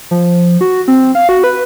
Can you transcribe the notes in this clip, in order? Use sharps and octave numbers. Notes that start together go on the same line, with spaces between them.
F3
F#4
C4
F5
F#4
B4